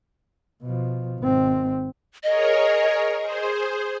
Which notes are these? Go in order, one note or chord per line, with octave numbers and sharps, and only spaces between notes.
B2 F3
G#1 C4
G#4 A#4 C#5 D#5
G#4 C5